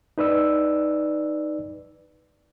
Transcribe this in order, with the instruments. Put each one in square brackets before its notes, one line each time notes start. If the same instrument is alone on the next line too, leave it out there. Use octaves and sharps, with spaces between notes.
[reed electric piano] D#4 B4 D5 E6